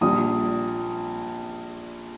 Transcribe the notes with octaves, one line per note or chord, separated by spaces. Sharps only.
A#1 A#2 G3 D#6